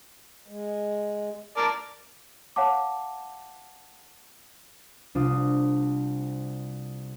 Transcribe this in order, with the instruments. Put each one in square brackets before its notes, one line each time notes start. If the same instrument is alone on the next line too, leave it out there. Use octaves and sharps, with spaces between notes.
[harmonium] G#3
[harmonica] A#4 D5 A5
[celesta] C#5 F5 F#5 A5 D6
[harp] C2 D4 F4 D#6